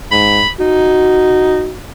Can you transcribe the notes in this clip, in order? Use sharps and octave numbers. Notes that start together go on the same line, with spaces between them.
G#2 B5
D#4 F#4